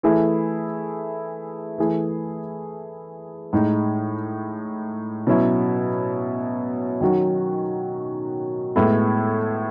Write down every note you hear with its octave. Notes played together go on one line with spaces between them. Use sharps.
E3 A3 E4 G#4
E3 A3 E4 G#4
A2 G#3 D#4
B2 F#3 C#4 E4
D#3 F#3 C#4 F#4
A2 G#3 B3 E4 A4